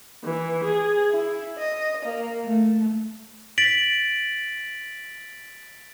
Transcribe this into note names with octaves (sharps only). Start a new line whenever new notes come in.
E3
G#4
E4
D#5
A#3
A3
A6 B6 D7 F#7